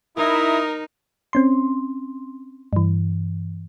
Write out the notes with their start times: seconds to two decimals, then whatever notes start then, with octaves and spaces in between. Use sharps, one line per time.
0.17 D#4 E4 A#4 D#6
1.33 C4 C#4 C6
2.73 G2 E3